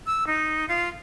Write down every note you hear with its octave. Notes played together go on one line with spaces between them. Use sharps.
E6
D#4
F4